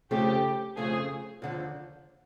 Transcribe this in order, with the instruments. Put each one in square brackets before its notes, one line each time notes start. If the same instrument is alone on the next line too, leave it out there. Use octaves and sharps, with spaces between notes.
[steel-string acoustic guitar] F2 C#3 F3 A3 C#4 [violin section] G4
[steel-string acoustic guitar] F2 C#3 F3 A3 C#4 [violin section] G#4
[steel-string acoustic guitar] D#2 D3 F3